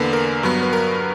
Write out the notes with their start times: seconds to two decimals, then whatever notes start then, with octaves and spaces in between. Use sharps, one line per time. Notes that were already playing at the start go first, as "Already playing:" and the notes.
Already playing: E2 D3 A#3 B4
0.13 A#4
0.43 G2 F#3 B3
0.63 B4
0.73 A#4